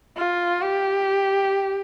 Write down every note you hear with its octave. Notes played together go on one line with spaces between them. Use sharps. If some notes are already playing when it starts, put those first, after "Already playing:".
F4
G4